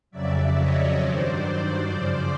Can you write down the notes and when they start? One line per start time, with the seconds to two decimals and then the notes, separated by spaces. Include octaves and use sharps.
0.11 F2 C#3 F#3 D5 E5
0.55 C#5 D#5
0.98 G2 D#3 F#3 C5 D5
1.86 F#2 C#3 F3